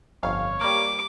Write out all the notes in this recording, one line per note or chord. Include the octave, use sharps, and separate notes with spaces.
G1 F2 C#5 F5
G3 A#3 D6